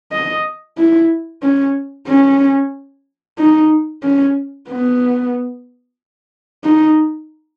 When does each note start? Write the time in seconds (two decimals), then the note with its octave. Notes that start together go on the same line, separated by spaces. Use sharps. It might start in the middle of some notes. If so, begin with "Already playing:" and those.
0.12 D#5
0.78 E4
1.42 C#4
2.08 C#4
3.38 D#4
4.03 C#4
4.69 B3
6.64 D#4